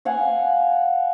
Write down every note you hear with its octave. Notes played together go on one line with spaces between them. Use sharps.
F5 F#5 G#5